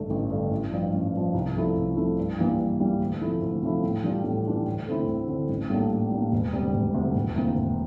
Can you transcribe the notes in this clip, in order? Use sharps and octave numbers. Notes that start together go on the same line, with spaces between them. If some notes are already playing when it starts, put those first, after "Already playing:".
Already playing: A1 G2 D3 A3
A1
G2 D3 A3
A1
G2 F3
A1
G2 F3
C2
C3 F3 A3 E4
C2
C3 F3 A3 E4
G2
E3 G3 A#3
G2
E3 G3 A#3
D2
C3 F3 A3 E4
D2
C3 F3 A3 E4
A2
E3 G3 D4 F4
A2
E3 G3 D4 F4
D2
D3 A3 C4 E4
D2
D3 A3 C4 E4
A1
A2 G3 A#3 D4
A1
A2 G3 A#3 D4
E1
D2 C3 G3
E1
D2 C3 G3
E1
D2 C3 E3 A#3
E1